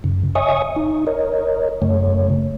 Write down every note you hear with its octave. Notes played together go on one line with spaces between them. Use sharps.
F#2 C#3
C#5 D#5 E5 G#5 C#6 D#6
D#4
A#4 C#5 D#5
F#2 C#3 A3 C#5